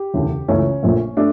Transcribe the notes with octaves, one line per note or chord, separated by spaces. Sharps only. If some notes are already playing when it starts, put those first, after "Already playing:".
Already playing: G4
E1 D2 C#3 E3
C#2 C#3 E3 A3 C#4
A#1 A#2 A3
A3 D4